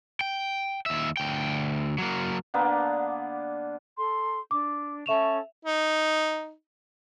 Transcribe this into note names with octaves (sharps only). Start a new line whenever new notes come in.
G5
D#2 E5
D2 G5
F#3 A#3
D3 A#3 B3 D4
A4 C6
D4 D6
C#4 A4 E5 C#6 E7 F7
D#4